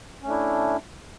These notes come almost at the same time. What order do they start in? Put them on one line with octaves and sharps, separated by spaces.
C#4 A3 D4 E4